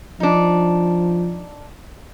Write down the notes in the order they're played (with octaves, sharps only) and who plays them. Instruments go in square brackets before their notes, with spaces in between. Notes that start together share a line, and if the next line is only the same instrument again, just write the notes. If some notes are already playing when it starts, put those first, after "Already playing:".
[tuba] F3 [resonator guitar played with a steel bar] D4 D#4